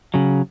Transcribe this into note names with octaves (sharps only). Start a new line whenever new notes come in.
C#3 F#3